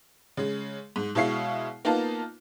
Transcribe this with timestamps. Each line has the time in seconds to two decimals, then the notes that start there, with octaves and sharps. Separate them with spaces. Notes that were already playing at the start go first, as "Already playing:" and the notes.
0.37 C#3 G#3
0.96 G#2
1.15 B2 G#3 E4 C#5 F5 C7
1.85 A#3 B3 D#4 F4 A5